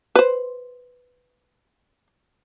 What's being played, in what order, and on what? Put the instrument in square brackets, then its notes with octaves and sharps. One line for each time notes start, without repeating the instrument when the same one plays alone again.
[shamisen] B4 C5